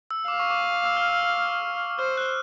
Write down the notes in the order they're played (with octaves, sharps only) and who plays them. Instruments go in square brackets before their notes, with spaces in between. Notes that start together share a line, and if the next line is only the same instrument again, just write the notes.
[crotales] E6
[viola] F5 [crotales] D6
[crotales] C#6
D6
E6
F6
E6
[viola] C5 [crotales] F6
[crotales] F#6